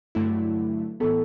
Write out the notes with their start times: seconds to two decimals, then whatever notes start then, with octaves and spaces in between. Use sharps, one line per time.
0.15 G2 D3 F#3 A3 E4
1.00 A2 E3 B3 A4